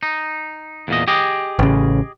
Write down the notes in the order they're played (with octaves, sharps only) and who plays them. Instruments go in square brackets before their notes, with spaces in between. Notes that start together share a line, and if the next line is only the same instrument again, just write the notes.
[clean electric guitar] D#4
E2 A#2 D#5
G4 G#4 D#5
[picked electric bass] A1 C#3